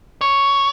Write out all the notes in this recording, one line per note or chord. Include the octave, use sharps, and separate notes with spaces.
C#5